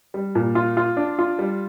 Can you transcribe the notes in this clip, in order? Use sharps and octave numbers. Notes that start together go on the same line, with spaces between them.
G3
A#2
F4
F4
D4
F4
G3